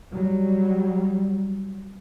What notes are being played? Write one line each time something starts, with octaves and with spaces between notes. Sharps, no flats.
F#3 G3